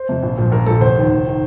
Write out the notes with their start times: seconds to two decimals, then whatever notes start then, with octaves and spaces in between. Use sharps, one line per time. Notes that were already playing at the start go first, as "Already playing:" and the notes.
Already playing: C5
0.09 F2 C3
0.23 A#1
0.38 A#2 F3
0.52 A#1 A#4
0.66 A#2 F3 A4
0.81 F1 C5
0.96 D#2 D#3
1.11 F1
1.27 D#3